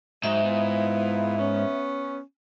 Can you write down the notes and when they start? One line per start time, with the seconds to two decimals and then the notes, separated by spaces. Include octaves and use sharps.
0.24 G#2 F#3 D#4 E5
0.44 B3 E4 F4
1.38 B3 C#4